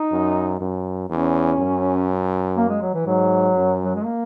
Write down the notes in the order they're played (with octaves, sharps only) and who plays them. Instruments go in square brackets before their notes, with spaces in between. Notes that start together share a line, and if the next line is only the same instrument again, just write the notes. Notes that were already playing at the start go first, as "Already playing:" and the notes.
Already playing: [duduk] D#4
[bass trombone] F#2
F#2
[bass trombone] E2 [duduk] C#4
[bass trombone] F#2
[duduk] A#3
G#3
F#3
E3
[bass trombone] G#2 [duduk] F#3
[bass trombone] F#2
[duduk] F#3
G#3
A#3